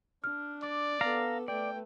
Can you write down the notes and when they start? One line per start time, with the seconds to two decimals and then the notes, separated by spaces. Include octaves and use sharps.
0.24 D4 F6
0.62 D5 D6
1.01 B3 A4 F5 A#5
1.48 A3 B4 D5 G5